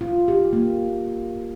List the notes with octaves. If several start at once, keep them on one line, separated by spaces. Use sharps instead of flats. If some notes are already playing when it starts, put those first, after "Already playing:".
F4
G4
A#3